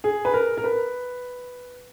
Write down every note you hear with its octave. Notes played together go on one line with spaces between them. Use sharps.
G#4
B4
A#4
A#4
B4